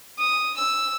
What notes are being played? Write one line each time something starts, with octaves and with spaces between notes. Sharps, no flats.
D#6
E6